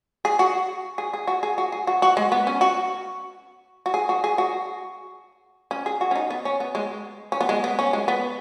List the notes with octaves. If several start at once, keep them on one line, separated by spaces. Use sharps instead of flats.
G#4
F#4
G#4
G#4
F#4
G#4
F#4
G#4
F#4
F#4
G#3
B3
C#4
F#4
F#4
G#4
F#4
G#4
F#4
C#4
G#4
F#4
C#4
D#4
B3
C#4
B3
G#3
C#4
B3
G#3
B3
C#4
G#3
B3